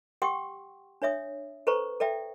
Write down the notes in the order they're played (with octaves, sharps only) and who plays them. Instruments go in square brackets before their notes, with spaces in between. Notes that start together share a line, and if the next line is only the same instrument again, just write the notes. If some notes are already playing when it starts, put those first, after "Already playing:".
[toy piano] G4 F#5 G5 C6 C#6 D#6
D4 C#5 E5 D#6
A4 B4 C5 A#5 C#6
A4 D5 E5 G5